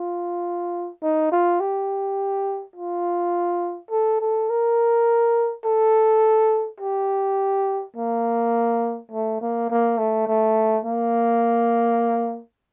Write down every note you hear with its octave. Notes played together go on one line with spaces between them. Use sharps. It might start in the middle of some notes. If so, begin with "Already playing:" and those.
Already playing: F4
D#4
F4
G4
F4
A4
A4
A#4
A4
G4
A#3
A3
A#3
A#3
A3
A3
A#3